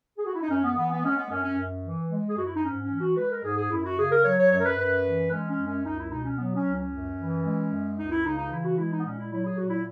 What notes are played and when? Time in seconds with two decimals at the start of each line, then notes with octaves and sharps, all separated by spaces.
0.18 G#4
0.26 F#4
0.34 E4
0.42 D#4
0.50 F#2 C#4
0.63 B3
0.76 E3 B3
0.91 B3
1.04 G#3 C#4
1.16 B3
1.30 F#2 C#4
1.43 C#4
1.57 F#2
1.83 E3
2.10 G#3
2.29 G#4
2.37 F#2 F#4
2.45 E4
2.55 D#4
2.63 G#2 C#4
2.82 C#4
2.90 E3
3.00 F#4
3.17 G#3 B4
3.30 A#4
3.44 G#2 G#4
3.57 G#4
3.70 F#2 E4
3.84 F#4
3.97 C#3 G#4
4.11 A#4
4.23 F#3 C#5
4.37 C#5
4.50 F#2 C#5
4.59 A#4
4.64 B4
4.77 F#2 B4
5.04 E3
5.30 G#3 C#4
5.48 C#4
5.58 F#2
5.66 C#4
5.84 C#2 D#4
5.98 E4
6.11 B2 D#4
6.24 C#4
6.38 F#3 B3
6.55 C#4
6.65 C#2
6.73 C#4
6.91 F#2
7.18 E3
7.45 G#3
7.71 F#2
7.98 C#2 D#4
8.11 E4
8.24 C#3 D#4
8.37 D#4
8.51 E3 E4
8.64 F#4
8.78 G#3 E4
8.91 D#4
9.00 B3
9.05 A#2 C#4
9.17 E4
9.31 F#3 E4
9.45 G#4
9.57 A#2 F#4
9.69 E4